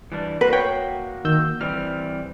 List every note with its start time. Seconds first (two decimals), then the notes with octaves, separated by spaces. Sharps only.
0.12 E3 G3 D4
0.41 A#3 F#4 B4
0.53 C#5 G5
1.25 D#3 E6 G6
1.61 E3 G3 C4 F6